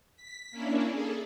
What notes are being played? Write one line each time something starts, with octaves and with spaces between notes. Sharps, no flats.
B6
A#3 C#4 D4 E4
G#4 A4